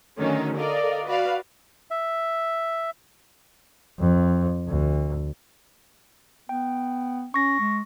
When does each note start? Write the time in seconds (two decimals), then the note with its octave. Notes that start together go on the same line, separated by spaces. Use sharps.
0.18 D3 D#3 F#3 A3 C#4 D#4
0.57 A4 A#4 D5 D#5 F5
1.06 F#4 B4 D5 F5
1.91 E5
3.99 F2
4.68 D2
6.49 B3 G5
7.34 C#4 C#6 A#6
7.60 G#3